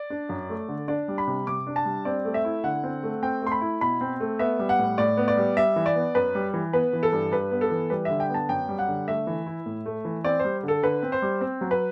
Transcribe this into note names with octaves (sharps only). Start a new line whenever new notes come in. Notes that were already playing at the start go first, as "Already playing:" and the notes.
Already playing: D5
D4
F#2
A3
D3
D4 D5
G3
B5
C3
C3 D6
D4
A5
G3
C4 D5
A3
E5
E4
D3 F#5
C4
A3
C4 G5
A3 C6
B5
E4
B2 B5
C4
A3
B3 E5
G3
F#5
A2
A2 D5
B3
D5
G3
G3 E5
E3
D5
B3
F#2 B4
G3
E3
B3 B4
E3
A4
G2
G2 B4
B3
A4
E3
G3 B4
D3 E5
G5
B3
A5
F#2 G5
G3
F#5
D3
A3 E5
E3
E4
A2
A3
E3
C4 D5
G3 C5
D3 A4
D3 B4
C4
C5
G3
C4
F#3
B4